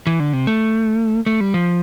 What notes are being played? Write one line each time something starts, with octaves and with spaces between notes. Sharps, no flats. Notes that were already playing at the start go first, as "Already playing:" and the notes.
E3
D3
C3
A3
A3
G3
F3